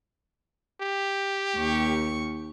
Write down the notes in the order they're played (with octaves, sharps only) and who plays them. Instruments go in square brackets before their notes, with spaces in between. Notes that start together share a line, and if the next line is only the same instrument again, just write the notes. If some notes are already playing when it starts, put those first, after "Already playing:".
[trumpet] G4
[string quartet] D#2 C#6